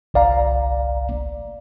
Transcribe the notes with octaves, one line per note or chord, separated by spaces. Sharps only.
G1 C2 D5 F5 A#5